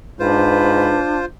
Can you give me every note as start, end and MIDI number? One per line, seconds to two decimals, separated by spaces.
0.19 0.99 44
0.19 1.24 62
0.19 1.25 65
0.19 0.99 71
0.19 1.25 72